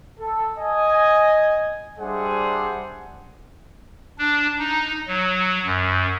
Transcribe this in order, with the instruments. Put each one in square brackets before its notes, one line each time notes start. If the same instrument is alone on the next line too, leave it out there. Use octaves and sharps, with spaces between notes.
[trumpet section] A4
D#5 G#5
G3 D4 G#4 C5 E5 F#5
[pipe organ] D4
D#4
F#3
F#2